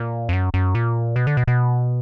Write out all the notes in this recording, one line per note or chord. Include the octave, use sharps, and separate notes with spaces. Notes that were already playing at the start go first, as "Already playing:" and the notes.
Already playing: A#2
F2
F#2
F#2
A#2
B2
D3
B2
B2